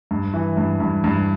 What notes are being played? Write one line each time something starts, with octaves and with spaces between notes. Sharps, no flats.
G2
E3
G2
G2
G2